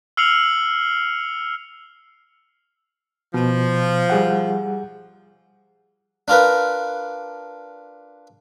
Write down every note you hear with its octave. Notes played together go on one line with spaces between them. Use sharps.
E6 F6 C7 C#7 F7 F#7
B2 F3
G3 G#4 F#5
D4 F4 A#4 B4